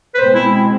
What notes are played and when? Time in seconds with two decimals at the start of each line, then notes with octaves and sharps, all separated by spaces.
0.15 B4
0.18 B2 G#3 C4 C5
0.34 E4
0.51 E4